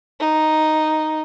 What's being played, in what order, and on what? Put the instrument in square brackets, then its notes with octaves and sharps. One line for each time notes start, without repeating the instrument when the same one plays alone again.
[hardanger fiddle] D#4